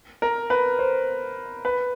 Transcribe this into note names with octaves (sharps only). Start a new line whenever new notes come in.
A#4
B4
C5
B4